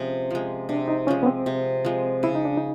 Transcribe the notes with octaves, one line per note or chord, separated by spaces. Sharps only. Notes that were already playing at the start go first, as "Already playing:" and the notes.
Already playing: C3 F3 G#3 C#4
F3 G#3
C3 D4
D#4
F3 G#3 C#4
B3
C4
C3
F3 G#3
C#3 E4
D#4
D4
D#4